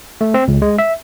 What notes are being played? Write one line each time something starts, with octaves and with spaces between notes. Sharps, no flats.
A3
C4
C#2
G#3
E5